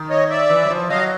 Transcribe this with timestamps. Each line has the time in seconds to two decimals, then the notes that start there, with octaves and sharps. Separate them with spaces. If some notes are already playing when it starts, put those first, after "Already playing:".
Already playing: D#3
0.10 C#5 D#5
0.30 D5 E5
0.50 E3
0.65 F#3
0.70 F3
0.90 F#3 D#5 F5